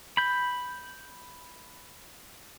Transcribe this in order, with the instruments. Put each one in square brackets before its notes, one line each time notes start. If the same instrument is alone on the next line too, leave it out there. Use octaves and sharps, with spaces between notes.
[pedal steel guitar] B5 G6